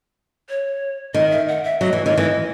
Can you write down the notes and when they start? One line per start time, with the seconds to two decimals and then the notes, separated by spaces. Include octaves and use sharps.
0.49 C#5
1.14 D#3 D#5
1.31 E5
1.48 F#5
1.64 E5
1.81 F#3 D#5
1.93 E3
2.05 D#3 C#5
2.14 E3 D#5